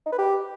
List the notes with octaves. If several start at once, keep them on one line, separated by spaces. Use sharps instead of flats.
D#4
B4
G4